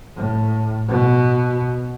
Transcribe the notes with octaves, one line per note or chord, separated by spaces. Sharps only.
A2
B2